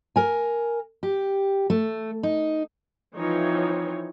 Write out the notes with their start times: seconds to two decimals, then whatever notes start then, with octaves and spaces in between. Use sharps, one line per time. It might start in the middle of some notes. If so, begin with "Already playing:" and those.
0.16 A#4 G#5
1.03 G4
1.70 A3
2.23 D#4
3.15 E3 F3 C4 D#4 E4 C#5